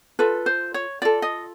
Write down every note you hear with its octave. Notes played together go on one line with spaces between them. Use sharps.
F4 A4 B4
C5
C#5
F4 A4 D5
D#5